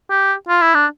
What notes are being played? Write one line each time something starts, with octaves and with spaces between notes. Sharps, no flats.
G4
F4
E4
D4